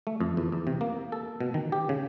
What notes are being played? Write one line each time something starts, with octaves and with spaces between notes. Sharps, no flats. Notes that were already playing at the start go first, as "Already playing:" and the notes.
A3
F2
E2
E2
C3
A#3
A4
B2
D#3
G4
C#3